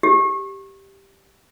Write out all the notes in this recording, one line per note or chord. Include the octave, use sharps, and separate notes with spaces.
G4